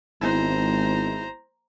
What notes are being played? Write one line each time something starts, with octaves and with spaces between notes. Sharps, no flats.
G#1 G#3 B3 E4 C5 A#5